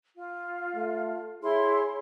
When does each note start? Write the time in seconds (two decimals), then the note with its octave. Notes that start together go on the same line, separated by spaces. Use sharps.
0.16 F4
0.76 A3
1.43 E4 G#4 C#5 C6